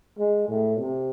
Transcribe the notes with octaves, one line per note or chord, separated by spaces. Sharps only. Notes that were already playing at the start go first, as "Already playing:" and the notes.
G#3
A2
C3